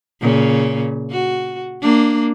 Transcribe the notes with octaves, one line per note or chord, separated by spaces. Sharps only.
A#2 C#3
F#4
A#3 D4